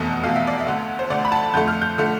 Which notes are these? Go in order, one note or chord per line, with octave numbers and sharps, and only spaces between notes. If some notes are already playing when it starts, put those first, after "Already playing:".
Already playing: F1 E2 B2 A3
F1 E2 B2 A3 F5
E5
D5
E5
D2 D3 A3
C5
D2 D3 A3 D5
B5
A5
F2 D3 A3 G6
F6
G6
D3 A3